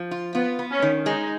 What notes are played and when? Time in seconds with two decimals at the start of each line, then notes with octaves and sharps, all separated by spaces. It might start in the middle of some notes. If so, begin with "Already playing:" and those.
Already playing: F3
0.11 F4
0.34 B3 F4
0.59 B3
0.70 C#4
0.82 D#3
1.06 G#3 D#4